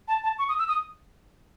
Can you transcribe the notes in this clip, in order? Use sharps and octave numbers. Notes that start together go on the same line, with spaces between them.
A5
A5
C#6
D#6
E6
D#6